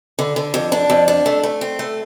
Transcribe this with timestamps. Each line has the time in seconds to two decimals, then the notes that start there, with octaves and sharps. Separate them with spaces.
0.19 D3
0.36 D3
0.54 F2
0.72 D4
0.90 F2
1.08 D4
1.26 A3
1.43 A3
1.61 C4
1.79 A3